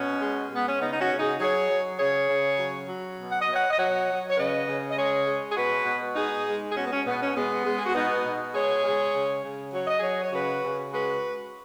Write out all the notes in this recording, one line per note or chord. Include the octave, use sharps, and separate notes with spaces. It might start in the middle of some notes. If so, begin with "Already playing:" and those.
Already playing: B2 C#4
G#3
G#3 B3
C#4
C#3 B3 D#4
D#4
C#4 F#4
C#3
D#4 G#4
F#3 G#4 C#5
F#3
C#3 G#4 C#5
C#3
F#3
F#3
B2
F#5
D#5
B2
C#5 F#5
D#5
F#3 C#5 F#5
F#3
C#5
C#3 B4 D#5
C#3
D#5
G#3 G#4 C#5
G#3
G#4
B2 F#4 B4
B2
G#3 D#4 G#4
G#3
G#4
B2 C#4 F#4
B3
C#4
B2 B3
C#4
G#3 B3
G#3
G#4
F#4
B2 B3 D#4
B2
G#3 G#4 C#5
G#3
C#3
C#3
F#3 C#5
D#5
F#3 G#4 C#5
C#5
C#3 F#4 B4
C#3
G#3 F#4 B4